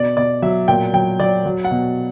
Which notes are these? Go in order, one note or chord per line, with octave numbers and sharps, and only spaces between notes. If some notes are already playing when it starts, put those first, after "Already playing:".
Already playing: B2 D5
B2 D5
F#3 E5
A#2 G5
F#3 G5
F#3 D5
F#3
F#5
B2